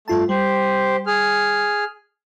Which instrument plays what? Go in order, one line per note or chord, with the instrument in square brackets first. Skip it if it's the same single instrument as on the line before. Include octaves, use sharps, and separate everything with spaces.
[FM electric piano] G2 F4 A5 [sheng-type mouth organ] A3
[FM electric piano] G3 [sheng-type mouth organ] G4 C5
[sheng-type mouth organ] G#4 F6